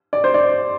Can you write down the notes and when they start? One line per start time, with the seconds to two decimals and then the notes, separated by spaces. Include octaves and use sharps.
0.13 D5
0.24 C5
0.34 D5